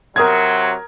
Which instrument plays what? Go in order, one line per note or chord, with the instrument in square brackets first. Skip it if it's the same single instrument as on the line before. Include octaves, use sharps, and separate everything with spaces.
[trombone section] C3 F#3 [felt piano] A#4 D#6 G#6